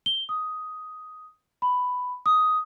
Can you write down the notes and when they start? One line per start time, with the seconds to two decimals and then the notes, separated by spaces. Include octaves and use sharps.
0.06 G7
0.29 D#6
1.62 B5
2.26 D#6